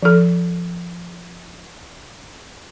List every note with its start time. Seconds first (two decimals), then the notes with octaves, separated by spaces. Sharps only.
0.02 F3 A4